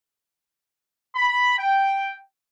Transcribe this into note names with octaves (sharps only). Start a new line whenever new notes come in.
B5
G5